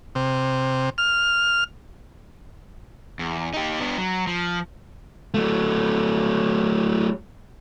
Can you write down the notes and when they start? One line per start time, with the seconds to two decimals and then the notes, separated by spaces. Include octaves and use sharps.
0.15 C3
0.98 F6
3.19 E2
3.53 D#4 G4
3.80 B3 D4
3.98 F#3
4.27 F3
5.34 F#3 A3